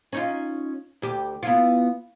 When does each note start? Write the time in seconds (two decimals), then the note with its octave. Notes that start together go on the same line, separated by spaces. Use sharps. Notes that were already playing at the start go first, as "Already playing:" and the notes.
0.13 C#4 D#4 F4
1.02 D2 G4
1.43 B3 E4 F4